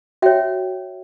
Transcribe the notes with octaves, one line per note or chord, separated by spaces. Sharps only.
F#4 C#5 E5 G5